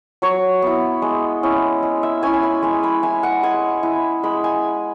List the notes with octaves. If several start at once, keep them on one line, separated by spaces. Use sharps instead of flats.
F#3 C#5
B3 E4
G#3
C#4 E4
G#3
E5
C#4 E4 G#5
G#5
B5
G#3 G#5
B5
E4 G#5
F#5
G#3 G#5
E4
G#3 B5
G#5